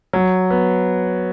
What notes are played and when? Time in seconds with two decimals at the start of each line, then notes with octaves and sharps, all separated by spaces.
0.13 F#3
0.50 B3